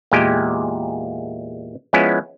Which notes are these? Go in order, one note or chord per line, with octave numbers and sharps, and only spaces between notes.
E2 A#2 G#3 A#3 G4 G5
F3 G#3 B3 C#4 E4